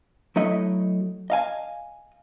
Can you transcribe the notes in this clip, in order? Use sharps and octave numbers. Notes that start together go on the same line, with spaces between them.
F#3 A3 E4 D#5
D#5 F5 G#5